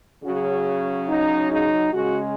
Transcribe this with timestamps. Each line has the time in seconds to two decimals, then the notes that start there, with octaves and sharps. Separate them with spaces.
0.24 C#3 F#3 F#4
1.08 D#4
1.50 D#4
1.92 C#3 G#3 F#4